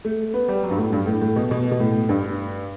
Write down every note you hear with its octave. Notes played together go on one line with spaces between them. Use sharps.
A3
B3
G3
F#3
G2
A2
G2
A2
A2
B2
B2
B2
A2
G2